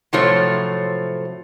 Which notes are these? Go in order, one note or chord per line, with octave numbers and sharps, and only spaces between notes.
A2 C3 F3 F#3 A3 C#5